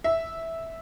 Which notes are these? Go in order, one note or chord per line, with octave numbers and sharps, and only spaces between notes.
E5